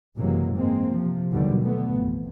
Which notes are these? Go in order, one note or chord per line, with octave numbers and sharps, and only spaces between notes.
F#1 C3 E3 F#3 G#3 A#3
G#2 G#3 A#3 C4
C3 F3
D#2 B2 D3 D#3 F#3 G3
D3 A3 B3
A1 F2